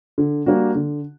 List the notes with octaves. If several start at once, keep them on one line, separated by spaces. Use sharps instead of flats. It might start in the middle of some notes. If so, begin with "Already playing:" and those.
D3
G3 A#3 D4 F#4
D3